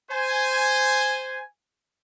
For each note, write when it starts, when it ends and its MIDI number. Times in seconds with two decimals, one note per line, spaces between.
0.11 1.42 72
0.11 1.42 80